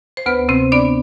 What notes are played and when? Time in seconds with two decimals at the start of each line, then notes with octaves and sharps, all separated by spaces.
0.17 C5
0.26 D2 B3 B4
0.49 C3 C4 C5
0.72 B3 D4 D5